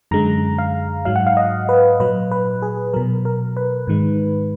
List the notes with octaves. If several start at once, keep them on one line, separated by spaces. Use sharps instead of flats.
F#2 D3 G#3 A#5
F5
G#2 F#3 F5
F#5
F5
D#5
B4
A#2 F#3 B4
B4
G#4
B2 F#3 A#4
A#4
B4
G#2 D#3 G#3